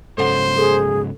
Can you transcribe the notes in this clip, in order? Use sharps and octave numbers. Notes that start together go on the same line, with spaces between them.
G#2 C#3 F#3 A4 C5 F#5
G#4 A4